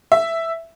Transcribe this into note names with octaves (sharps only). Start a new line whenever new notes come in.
E5